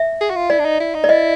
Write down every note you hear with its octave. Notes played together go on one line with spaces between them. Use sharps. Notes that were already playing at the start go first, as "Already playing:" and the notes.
Already playing: E5
G#4
F#4
F4
E4 D5
D4
D#4
E4
D#4
D5
E4 D#5